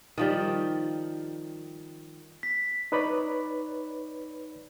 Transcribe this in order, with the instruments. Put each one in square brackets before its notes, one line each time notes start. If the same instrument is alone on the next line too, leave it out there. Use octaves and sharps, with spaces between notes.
[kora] D#3 F3 G3
[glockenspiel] B6
[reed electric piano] D#4 B4 C#5 D5 B5